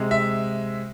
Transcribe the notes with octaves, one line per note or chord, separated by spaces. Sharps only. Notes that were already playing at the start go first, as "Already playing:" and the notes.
Already playing: C3 G#3
E5